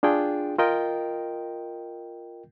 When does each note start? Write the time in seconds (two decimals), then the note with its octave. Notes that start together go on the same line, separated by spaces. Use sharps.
0.03 D4 F4 G#4 G5
0.59 F4 A#4 D#5 G5